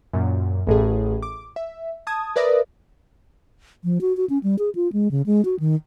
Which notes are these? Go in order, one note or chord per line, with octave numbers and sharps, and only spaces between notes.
F#2 A#2
A1 A2 G#4
D6
E5
A5 D#6 G#6
A#4 B4 D5 E5 D#6 A#6
F3
F#4
F#4
C#4
G3
G#4
F4
G#3
C#3
G#3
F#4
D#3